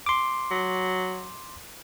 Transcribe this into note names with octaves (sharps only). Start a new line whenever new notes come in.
C6 D6
F#3